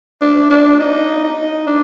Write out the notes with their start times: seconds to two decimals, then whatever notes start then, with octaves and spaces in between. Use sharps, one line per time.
0.21 D4
0.50 D4
0.80 D#4
1.24 D#4
1.67 D4